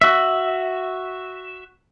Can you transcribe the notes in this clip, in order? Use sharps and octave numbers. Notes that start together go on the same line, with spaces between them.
F#4 E5